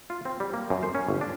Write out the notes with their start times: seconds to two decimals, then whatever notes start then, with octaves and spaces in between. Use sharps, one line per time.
0.10 F4
0.25 C4
0.40 G3
0.54 A#3
0.70 F#2
0.83 C5
0.95 C#4
1.08 G1
1.21 D4